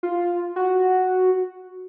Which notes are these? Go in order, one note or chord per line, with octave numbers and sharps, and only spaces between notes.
F4
F#4